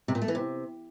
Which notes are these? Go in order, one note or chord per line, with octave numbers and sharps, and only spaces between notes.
C3
A#2
A3
E3
C3